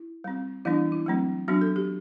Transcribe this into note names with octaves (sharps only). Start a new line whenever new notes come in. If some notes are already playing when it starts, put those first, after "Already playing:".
Already playing: E4
G3 C4
E3 G3 B3 D4 E4
E4
F#3 A3 C4
F#3 B3 D4 F#4
A4
G4